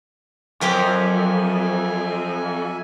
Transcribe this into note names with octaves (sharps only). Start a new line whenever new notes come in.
F2 F#3 C4 G4 A#4 E5 G#5